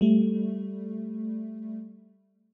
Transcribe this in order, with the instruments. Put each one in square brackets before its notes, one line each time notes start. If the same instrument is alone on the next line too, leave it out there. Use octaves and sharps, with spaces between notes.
[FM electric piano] G3 A3